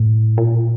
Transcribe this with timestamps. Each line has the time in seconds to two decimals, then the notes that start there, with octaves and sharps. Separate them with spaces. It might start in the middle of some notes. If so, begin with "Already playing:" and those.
Already playing: A2
0.38 A#2